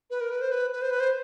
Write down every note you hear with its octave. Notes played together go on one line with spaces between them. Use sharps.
B4
A#4
B4
C5
B4
B4
C5
B4
C5